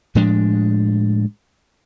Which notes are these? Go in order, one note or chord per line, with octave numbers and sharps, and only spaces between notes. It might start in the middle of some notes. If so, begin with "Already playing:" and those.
A2 F3 G#3 D4